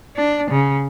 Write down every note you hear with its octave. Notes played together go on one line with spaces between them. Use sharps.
D4
C#3